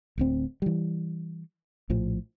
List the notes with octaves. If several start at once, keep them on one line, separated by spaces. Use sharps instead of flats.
D1 D2 C4
E3 G3
A#1 A2 F3